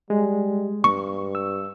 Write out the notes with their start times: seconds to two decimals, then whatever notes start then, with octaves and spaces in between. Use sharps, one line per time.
0.10 G3 G#3
0.84 G2 C#6
1.35 E6